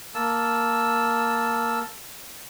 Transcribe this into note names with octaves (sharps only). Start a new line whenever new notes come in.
A#3 A5 E6